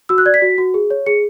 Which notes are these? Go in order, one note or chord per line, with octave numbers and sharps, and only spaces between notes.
F#4 E6
F#6
D5 G#6
B6
F#4
F#4
G#4
C#5
G#4 C#7